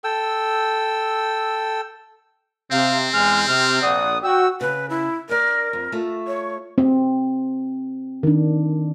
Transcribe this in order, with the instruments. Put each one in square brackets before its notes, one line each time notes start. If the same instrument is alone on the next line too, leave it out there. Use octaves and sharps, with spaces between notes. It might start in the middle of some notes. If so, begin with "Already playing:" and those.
[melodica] A4 G5 E6
[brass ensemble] C3 [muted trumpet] C4 [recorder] F5
[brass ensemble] E2 G#3 G#5 [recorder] F6
[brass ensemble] C3 [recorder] F6
[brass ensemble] A#1 D5 F#5 [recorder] D#6
[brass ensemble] F#4 G5 [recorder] E6
[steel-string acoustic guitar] C#3 [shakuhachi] B4
[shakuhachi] E4
[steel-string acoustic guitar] D4 D5 [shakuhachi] A#4
[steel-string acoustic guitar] F2
A3 F4 E5
[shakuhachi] C#5
[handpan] C4
D#3 D4